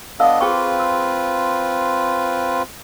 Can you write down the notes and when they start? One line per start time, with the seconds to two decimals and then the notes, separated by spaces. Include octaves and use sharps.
0.20 B3 D4 A4 D#5 F5 E6
0.41 C4 F4 G#4 B4 G5 C#6
0.80 E6